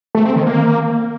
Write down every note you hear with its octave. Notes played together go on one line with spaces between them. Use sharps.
A3
C4
D#3
A#3